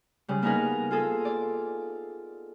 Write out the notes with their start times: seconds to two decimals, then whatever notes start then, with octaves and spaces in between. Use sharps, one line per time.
0.28 C#3 G3
0.42 A#3 B3 D#4 G#4 A#4 B4
0.91 F4 G#4 A4
1.25 D5